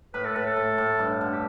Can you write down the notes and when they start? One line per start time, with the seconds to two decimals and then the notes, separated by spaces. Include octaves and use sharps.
0.14 A2 B4
0.25 A4
0.35 A2 B4
0.46 A4
0.56 A2
0.78 A2
0.99 G2
1.21 D3
1.32 G4